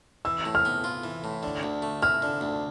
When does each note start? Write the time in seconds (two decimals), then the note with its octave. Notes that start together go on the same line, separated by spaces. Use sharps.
0.25 E3 E6
0.45 A2
0.55 F6
0.65 B3
0.84 F4
1.04 E3
1.24 A2
1.43 D3
1.63 D2
1.82 A3
2.02 E4 F6
2.22 D3
2.41 D2